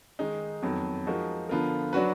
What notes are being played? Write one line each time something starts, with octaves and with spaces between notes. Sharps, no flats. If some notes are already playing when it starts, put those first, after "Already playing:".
D#3 G#3 D#4
F2 D#3 F#3 B3
F3 G#3 D#4 F#4 A#4
D3 F3 B3 F4 A#4
F#3 D4 F#4 B4